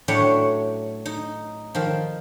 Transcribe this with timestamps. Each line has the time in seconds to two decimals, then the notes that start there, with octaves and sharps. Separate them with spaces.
0.08 A2 F#3 D4 C#5 G5 B5
1.06 D#4
1.75 D#3 F3